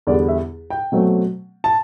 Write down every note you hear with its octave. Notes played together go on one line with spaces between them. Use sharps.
E2 D3 G3 B3 D5
E5
G5
B2 F#3 A3 C4
A5